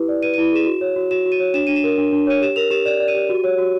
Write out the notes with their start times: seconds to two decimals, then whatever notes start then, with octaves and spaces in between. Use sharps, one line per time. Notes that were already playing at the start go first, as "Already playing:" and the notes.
Already playing: E4 G4 B4
0.09 D5
0.23 B4 D#7
0.34 E4 D#7
0.52 G#4 E7
0.66 F#4
0.81 C#5
0.96 F#4
1.11 F#4 E7
1.26 F#4
1.32 D#7
1.40 C#5
1.54 D4 E7
1.67 D4 D#7
1.76 E7
1.84 A#4
1.98 D4
2.13 D4
2.27 C#5 D#7
2.42 G4 E7
2.56 A#4 F7
2.71 G4 E7
2.85 D5 E7
3.00 D5
3.08 D#7
3.15 G4
3.29 F#4
3.44 C#5
3.58 F#4